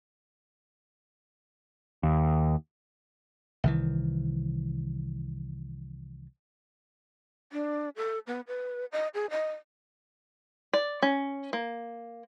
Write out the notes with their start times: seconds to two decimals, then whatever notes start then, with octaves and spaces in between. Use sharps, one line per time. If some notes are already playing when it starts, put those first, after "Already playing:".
2.03 D#2
3.64 C2 D#3 E3
7.53 D4
7.96 A4
8.27 B3
8.47 B4
8.92 D#5
9.14 G#4
9.31 D#5
10.73 D5
11.03 C#4
11.53 A#3